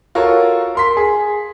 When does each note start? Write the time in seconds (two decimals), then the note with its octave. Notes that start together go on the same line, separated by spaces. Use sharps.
0.15 F4 F#4 A4 A#4 C#5
0.75 A#4 C6 B6
0.97 G#4